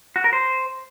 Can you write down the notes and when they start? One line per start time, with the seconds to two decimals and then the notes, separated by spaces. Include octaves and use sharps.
0.16 F#4
0.24 A#4
0.33 C5